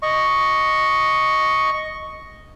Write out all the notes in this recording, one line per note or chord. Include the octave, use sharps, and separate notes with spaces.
D#5 C#6